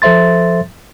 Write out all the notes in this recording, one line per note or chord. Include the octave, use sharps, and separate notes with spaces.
F3 A4 C5 E5 C6 A6